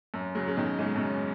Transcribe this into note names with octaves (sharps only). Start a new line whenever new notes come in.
F#2
C#3 F#3
C#3
B2 D#3
G#2 C#3
F#2 B2